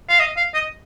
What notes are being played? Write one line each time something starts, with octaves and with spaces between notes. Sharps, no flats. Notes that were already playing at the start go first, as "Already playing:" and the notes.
F5
D#5
F5
D#5